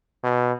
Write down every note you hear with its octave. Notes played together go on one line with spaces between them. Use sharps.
B2